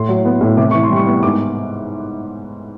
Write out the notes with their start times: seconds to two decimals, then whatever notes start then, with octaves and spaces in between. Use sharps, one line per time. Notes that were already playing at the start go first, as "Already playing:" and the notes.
Already playing: A2 C6
0.09 F#3
0.25 B3
0.41 A2
0.57 C3 D6
0.71 E3 C#6
0.84 C6
0.91 G3
0.96 C#6
1.07 B3
1.23 G#2 D6